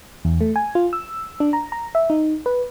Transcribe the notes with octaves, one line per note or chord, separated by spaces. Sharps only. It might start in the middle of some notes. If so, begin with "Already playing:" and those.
E2
A3
G#5
F4
E6
D4
A#5
A#5
E5
D#4
B4